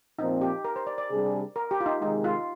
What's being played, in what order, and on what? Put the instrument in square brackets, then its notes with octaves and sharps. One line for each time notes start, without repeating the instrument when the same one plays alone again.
[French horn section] A#2 F3 C4 [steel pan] D#4
[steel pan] G4
A#4
C5
D5
D5
[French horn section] C3 G3 D4 G#4
[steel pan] A#4
G4
F4
D#4
[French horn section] C3 D#3 G#3 [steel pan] D#4
[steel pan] F4